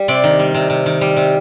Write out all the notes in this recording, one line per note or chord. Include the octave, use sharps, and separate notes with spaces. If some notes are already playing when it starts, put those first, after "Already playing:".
Already playing: G3
C3 D5
D#3
G3
C3
C3
D#3
G3
C3